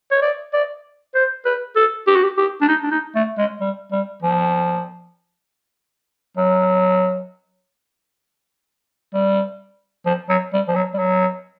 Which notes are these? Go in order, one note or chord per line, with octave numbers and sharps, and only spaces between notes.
C#5
D5
D5
C5
B4
A4
G4
F#4
G4
G4
D4
D#4
D4
D#4
A3
G#3
G3
G3
F3
F#3
G3
F3
F#3
G3
F3
F#3
G3
F#3